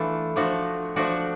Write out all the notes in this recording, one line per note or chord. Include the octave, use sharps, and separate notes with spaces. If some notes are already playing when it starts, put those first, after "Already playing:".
Already playing: E3 A3 D4 F4 A4
F3 A3 D4 F#4
F3 A3 D4 F#4